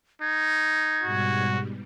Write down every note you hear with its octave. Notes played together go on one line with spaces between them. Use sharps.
D#4 G#6
G#2 B2 G3 F#4